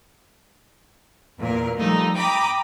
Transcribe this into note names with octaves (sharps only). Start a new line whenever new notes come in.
E2 A#2 A#4
F3 G3 A3 D#4
G5 A#5 B5 D6 D#6